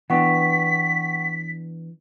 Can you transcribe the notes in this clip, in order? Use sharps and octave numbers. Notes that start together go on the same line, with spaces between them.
E3 B3 D4 F#5 G5 C#6 B6